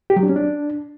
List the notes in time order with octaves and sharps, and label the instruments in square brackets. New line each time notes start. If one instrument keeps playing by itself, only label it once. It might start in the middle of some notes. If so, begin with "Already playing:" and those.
[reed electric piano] G4
F#3
D4
C#4
D4